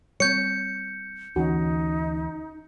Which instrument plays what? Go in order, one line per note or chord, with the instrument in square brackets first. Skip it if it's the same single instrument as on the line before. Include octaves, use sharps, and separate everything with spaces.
[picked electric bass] G3 C4 [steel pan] C#5 [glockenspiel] G6 C#7
[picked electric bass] D2 E3 [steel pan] C#4 F#4 [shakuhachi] D#4